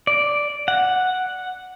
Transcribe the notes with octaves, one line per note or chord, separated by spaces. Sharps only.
D5
F#5